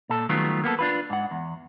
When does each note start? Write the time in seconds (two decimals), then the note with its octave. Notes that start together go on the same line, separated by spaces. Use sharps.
0.09 A#2 A4
0.29 D#3 F#3 G3 A3 B3 F4
0.64 A#3 B3 G4 A4
0.79 D4 F4 B4
1.10 G#2 F#5
1.31 E2